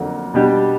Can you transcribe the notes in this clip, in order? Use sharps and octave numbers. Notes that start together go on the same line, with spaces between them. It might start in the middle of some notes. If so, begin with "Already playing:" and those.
Already playing: F2 D3 F#3 A#3
B2 G3 B3 D4 G4